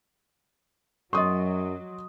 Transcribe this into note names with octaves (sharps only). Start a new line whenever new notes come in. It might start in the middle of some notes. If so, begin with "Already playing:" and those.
F#2 F#3 D#5 C6 C#6 D#6